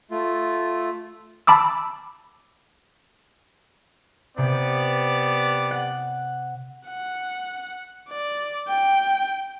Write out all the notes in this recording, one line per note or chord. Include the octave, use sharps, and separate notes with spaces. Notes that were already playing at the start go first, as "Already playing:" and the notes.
A3 F4
A5 B5 D6 E6
C3 B3 G4 D5
F#5
F#5
D5
G5